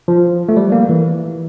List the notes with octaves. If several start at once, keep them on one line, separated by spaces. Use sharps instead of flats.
F3
A3
G3
A#3
E3